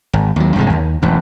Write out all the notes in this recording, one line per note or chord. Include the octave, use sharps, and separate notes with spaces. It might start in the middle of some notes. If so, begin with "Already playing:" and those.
G#1
D#2 F#3
E1 G2 C3 G#3
D#2
E1 A1 F#2